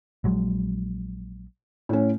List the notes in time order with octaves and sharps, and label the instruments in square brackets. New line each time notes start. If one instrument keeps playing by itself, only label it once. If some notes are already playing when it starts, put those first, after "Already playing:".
[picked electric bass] A#1 F#3 G#3
[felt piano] A2 C#4